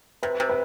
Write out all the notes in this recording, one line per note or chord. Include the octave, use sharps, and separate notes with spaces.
C3 B4
C3
B4